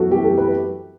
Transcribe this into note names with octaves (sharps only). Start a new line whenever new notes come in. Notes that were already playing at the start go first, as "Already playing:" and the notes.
Already playing: F#2 E3 B3 F#4 A4
F#2 E3 B3 G4
A4
B4